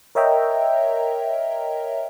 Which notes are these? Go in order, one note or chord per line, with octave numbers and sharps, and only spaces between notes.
A#4 C#5 D#5 E5 G5 A#5